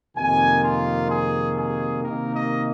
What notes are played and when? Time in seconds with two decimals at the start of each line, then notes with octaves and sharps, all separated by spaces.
0.16 F2 C3 D#3 A#3 G#5
0.63 F4
1.10 G#4
1.56 G#4
2.04 C3 D#3 A#3 D#4 A#4
2.34 D#5